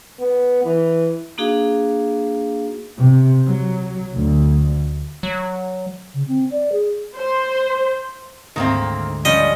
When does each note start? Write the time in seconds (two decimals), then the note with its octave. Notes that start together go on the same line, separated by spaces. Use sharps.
0.20 B3
0.64 E3
1.38 A#3 D4 D#4 F#4 G#4 F5
2.98 C3
3.46 F#3
4.15 D2
5.23 F#3
6.14 C#3
6.28 C4
6.51 D5
6.72 G#4
7.16 C5
8.56 D2 G#2 D#3 A#3 C4
9.25 F3 G3 C#4 D#5